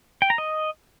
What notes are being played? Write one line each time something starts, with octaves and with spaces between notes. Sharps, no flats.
G5
A#5
D#5